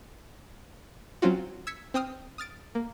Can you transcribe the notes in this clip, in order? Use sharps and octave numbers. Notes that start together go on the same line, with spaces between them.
F#3 C4 C#4 F4 F#4
E6 G#6 B6 C#7
C4 G5 D#6 F6
D#6 F6 A6 D7
A#3